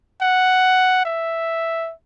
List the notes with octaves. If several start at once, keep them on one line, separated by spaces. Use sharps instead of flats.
F#5
E5